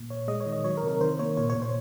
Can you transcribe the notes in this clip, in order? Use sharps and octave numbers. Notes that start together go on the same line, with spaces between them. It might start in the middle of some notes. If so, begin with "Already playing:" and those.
Already playing: A#2
A#2 C#5
G#3 D#5
C#5
D#3
D#5
F#3 C#5
A#4
C3
A#4
D#3 C5
A#3 C#5
A#2 C#5
C#5
A#2
C5